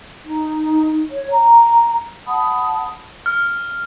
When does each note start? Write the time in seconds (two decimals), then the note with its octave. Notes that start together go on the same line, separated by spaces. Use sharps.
0.25 D#4
1.11 C#5
1.32 A#5
2.27 F#5 A5 B5 D#6
3.26 F6